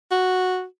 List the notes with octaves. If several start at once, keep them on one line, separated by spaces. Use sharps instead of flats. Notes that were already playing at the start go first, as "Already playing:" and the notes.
F#4